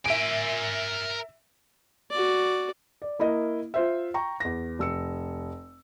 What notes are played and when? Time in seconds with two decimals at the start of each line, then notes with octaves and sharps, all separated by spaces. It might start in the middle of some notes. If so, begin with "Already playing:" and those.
0.06 A#4 E5 G#5 D7
2.11 F#4 D5
3.02 D5
3.19 A#3 E4 A#4 D#5
3.74 F4 C5 E5
4.14 G5 A#5 C#6
4.40 E2 A#6
4.79 F1 E6 C#7